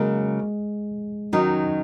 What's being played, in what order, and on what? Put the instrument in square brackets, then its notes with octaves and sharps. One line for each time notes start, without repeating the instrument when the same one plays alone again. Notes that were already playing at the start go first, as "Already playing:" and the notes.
Already playing: [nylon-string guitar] C#3 F#3 A#3 C#4 [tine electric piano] G#3
[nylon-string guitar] D#3 F#3 D#4 [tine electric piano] C#4